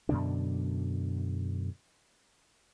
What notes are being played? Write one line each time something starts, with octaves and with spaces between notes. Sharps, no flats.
F#2 B2 D3 D4